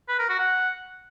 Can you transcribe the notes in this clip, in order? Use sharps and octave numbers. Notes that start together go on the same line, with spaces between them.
B4
A#4
F#4
F#5